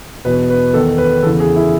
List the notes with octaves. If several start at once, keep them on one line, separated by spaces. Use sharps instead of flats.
E2 B2 B4
B4
E2 D#3 A4
B4
E2 C#3 E3 A4
G#4
E4